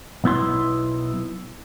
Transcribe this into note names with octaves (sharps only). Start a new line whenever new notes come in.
B1 B3 E4 C6